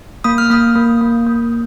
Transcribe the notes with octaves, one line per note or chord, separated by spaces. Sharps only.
A#3 D#6
F6
A#3 D#6
A#3
A#3
A#3